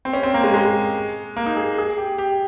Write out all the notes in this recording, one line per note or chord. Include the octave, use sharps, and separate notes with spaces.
C4
C#4
C4
A#3
G#3
G#3
A#3
D#4
G#4
G#4
G4
G4